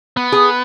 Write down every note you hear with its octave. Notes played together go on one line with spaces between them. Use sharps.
B3
G#4